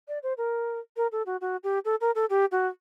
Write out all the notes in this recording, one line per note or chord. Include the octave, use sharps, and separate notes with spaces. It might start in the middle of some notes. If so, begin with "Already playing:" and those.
D5
C5
A#4
A#4
A4
F#4
F#4
G4
A4
A#4
A4
G4
F#4